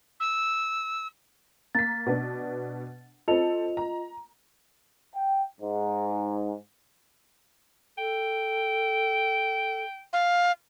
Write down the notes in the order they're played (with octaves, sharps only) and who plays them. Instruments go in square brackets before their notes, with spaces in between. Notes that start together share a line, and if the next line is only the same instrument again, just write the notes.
[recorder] E6
[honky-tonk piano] A#3 B6 [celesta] A6
[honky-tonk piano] B2 B3 D4
[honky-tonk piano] C4 A4 [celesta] F4 D#5 F7
[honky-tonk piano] A#5
[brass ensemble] G5
G#2
[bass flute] A4 [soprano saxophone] G5
[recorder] F5